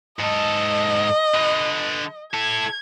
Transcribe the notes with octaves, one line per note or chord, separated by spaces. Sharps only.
G#2 A4 D#5
D3 B4
E4 A4 G#6